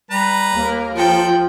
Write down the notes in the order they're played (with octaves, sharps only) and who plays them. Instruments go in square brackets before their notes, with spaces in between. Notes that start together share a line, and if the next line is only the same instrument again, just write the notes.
[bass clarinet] G3 [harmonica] B4 A#5
[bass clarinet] D#2 [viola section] A#3 A#4
[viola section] F3 [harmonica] A4 [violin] G5